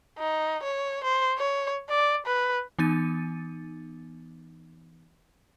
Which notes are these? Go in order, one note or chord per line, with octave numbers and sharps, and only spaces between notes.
D#4
C#5
C5
C#5
D5
B4
E3 B3 D#4 A6 D#7